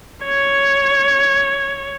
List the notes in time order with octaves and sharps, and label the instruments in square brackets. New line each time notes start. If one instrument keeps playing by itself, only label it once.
[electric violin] C#5 G#6